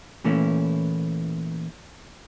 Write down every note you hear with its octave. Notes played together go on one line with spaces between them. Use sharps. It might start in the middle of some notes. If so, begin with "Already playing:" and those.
A#2 E3 A3 C#4 E4